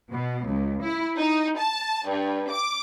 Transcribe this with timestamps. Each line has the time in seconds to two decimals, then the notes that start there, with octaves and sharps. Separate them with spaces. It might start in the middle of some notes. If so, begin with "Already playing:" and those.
0.10 B2
0.45 C#2
0.82 E4
1.16 D#4
1.58 A5
2.08 G2
2.50 D6